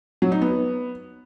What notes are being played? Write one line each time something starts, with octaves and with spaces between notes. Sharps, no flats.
F#3
D#4
B3